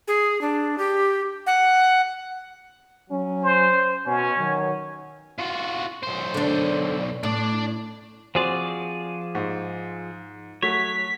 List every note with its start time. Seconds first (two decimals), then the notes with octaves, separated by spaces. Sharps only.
0.08 G#4
0.41 D4
0.78 G4
1.47 F#5
3.10 F#3 C#4
3.43 C5
4.06 B2 C#4
4.38 D#3 F#3
5.38 F4 F#4
6.03 B1 C5
6.34 D3 D4
7.23 A2 D4 D5
8.35 F3 C4 F#4 G#4 C5 D5
9.35 G#2
10.62 F#3 A3 C#5 B6